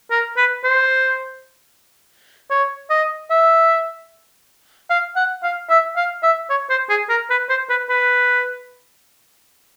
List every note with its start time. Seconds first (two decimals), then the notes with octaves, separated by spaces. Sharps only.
0.11 A#4
0.37 B4
0.64 C5
2.50 C#5
2.90 D#5
3.31 E5
4.90 F5
5.16 F#5
5.43 F5
5.70 E5
5.96 F5
6.23 E5
6.50 C#5
6.70 C5
6.90 G#4
7.09 A#4
7.30 B4
7.49 C5
7.70 B4
7.90 B4